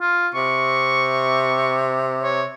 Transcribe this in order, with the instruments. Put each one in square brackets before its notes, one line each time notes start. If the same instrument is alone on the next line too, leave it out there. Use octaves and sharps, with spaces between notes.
[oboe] F4
[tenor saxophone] C3 [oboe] C#6
[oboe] C#5